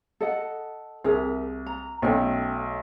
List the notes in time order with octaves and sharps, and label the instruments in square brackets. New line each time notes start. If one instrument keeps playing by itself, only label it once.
[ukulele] A4 D#5 F#5
[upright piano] C2 [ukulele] G#4 A#4 E5
[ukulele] A#5
[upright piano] B1 A3 [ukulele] C#4 G5